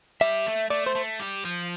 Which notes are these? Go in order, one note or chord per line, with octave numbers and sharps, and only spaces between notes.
G3 E5
A3
A3 D5
C5
A3
G3
F3